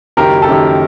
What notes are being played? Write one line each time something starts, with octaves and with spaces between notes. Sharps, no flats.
F#1 F#2 D#3 G4 A#4
A4
F#1 F#2 D#3 G4